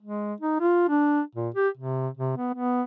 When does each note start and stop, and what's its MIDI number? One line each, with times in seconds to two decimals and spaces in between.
0.02 0.34 56
0.41 0.55 63
0.61 0.86 65
0.89 1.21 62
1.36 1.49 46
1.55 1.68 67
1.78 2.09 48
2.17 2.35 48
2.37 2.53 59
2.54 2.82 59